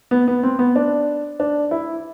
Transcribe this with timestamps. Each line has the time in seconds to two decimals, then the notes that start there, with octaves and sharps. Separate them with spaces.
0.11 B3
0.28 B3
0.43 C4
0.59 B3
0.76 D4
1.40 D4
1.71 E4